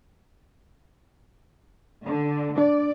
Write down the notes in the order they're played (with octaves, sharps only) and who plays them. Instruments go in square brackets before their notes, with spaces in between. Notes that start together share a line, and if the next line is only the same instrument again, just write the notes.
[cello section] D3
[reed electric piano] D4 [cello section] D5